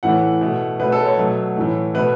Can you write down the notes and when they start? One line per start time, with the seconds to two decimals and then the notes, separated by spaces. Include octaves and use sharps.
0.03 A2 E3 A3 F#5
0.41 B2 A3
0.80 B2 A3 B4
0.92 A4
1.05 C#5
1.18 B2 F#3 A3
1.56 A2 E3 A3
1.94 B2 A3 B4